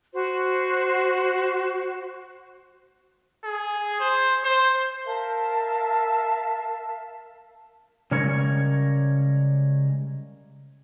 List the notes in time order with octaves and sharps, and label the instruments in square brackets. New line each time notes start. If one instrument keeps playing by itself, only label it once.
[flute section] F#4 C5
[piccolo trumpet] G#4
C5
C5
[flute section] A#4 E5 F5 A5
[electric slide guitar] C#3 G3 G#3 A#4 C#5